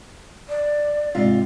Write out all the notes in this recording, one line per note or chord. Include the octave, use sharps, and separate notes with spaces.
D5
G#2 C3 F4